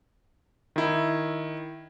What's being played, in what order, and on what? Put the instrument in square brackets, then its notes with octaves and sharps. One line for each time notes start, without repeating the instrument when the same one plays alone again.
[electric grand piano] D#3 E4